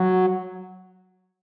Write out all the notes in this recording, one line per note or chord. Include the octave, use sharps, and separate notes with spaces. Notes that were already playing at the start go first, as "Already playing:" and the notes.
Already playing: F#3